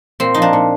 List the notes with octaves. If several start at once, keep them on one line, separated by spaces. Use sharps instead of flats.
A#2 C4
F3 D#4
D4
A#2